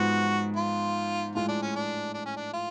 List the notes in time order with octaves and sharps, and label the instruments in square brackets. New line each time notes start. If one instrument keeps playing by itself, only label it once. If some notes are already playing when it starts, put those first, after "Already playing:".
Already playing: [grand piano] G#2 F3 G#3 B3 [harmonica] F#4
[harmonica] F4
[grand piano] A2 F3 G#3 [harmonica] F4
[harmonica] D4
C#4
D4
D4
C#4
D4
F4